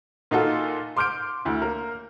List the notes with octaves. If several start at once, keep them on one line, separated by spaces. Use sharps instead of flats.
A#2 D#4 F4 F#4 A4
C6 D6 F6 G6 D7
D2 E4
A#3 A#4